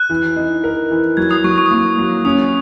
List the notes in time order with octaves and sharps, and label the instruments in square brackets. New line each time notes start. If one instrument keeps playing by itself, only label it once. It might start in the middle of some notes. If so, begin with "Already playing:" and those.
Already playing: [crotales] F#6
[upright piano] E3
D#4
A#4
E3
[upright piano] F#3 [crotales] G#6
[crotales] D#6
[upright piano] F#3 [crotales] C#6
[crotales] C#6
D#6
[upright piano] A#3 [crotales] C#6
[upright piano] F#3
[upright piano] C#4 [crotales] D#6